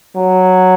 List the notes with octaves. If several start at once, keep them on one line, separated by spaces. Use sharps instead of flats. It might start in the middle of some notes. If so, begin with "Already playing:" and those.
F#3